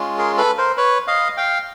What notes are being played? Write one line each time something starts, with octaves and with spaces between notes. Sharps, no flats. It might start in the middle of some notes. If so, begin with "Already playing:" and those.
Already playing: G#3 C#4 F4
G#4 A#4
A4 B4
A#4 C5
B4 C#5
D#5 F5
F5 G5